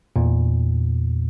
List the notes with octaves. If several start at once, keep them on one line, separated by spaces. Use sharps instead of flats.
E2 A#2